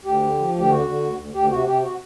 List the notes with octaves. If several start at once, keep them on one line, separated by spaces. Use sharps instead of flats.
D2 G4
D3
F3
D2
G4
D3 F#4
D3
D2
D2
D2 G4
C3 F#4
C3 G4
F#4